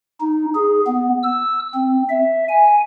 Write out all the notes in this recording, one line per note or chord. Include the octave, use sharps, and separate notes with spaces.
D#4
G#4
B3
E6
C4
E5
G#5